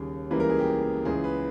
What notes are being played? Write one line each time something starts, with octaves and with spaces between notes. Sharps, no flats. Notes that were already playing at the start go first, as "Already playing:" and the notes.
Already playing: D#2 C#3 G3 G#4
C#2 C#3 E3 G3 A#3 B4
A#4
G#4
G4
C#2 C#3 E3 G#4
B4